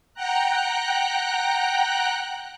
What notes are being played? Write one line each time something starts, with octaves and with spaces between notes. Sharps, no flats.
F#5 G5 A#5 F#6